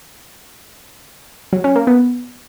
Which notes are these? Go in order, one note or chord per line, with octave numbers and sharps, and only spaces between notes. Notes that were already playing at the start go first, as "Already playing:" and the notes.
F#3
C#4
A#3
B3